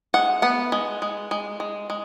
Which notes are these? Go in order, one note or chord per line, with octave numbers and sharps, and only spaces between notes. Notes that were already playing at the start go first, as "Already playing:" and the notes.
G#3 F#5
B3 F#5
G#3
G#3
G#3
G#3
G#3